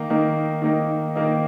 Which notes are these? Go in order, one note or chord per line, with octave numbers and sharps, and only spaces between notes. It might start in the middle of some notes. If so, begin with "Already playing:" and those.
Already playing: D#3 A#3 D#4
D#3 A#3 D#4
D#3 A#3 D#4
D#3 A#3 D#4